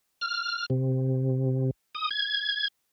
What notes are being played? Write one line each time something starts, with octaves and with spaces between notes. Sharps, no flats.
F6
C3
D#6
G#6